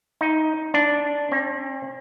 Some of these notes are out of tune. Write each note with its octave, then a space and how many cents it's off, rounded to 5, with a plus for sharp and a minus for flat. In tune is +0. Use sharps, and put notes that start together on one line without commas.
D#4 +10
D4 -10
C4 +45